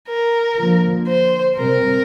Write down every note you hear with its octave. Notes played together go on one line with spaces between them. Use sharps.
A#4
D3 F3 A#3
C5
C3 G3 C4 A#4